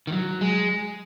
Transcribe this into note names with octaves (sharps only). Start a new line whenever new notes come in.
D#3
F#3
G#3